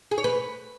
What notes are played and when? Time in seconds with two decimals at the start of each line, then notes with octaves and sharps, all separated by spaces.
0.11 G#4
0.18 C#5
0.24 B4